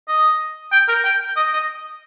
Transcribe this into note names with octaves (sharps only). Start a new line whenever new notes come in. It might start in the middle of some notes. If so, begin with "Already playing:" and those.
D#5
G5
A#4
G5
D#5
D#5